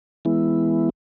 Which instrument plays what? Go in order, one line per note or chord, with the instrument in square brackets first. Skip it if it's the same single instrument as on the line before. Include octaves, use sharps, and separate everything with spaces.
[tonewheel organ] E3 G#3 B3 E4